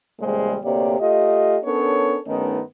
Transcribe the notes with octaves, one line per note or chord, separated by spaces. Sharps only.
E2 A#2 C#3 G3 G#3 C5
D2 C3 A#3 G4 C#5 D5
A3 F4 G4 D#5
B3 C#4 D4 A4 A#4 C#5
G2 D#3 A3 B3 C#4 D#4